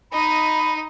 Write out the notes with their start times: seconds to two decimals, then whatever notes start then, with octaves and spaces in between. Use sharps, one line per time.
0.12 D#4 D#5 B5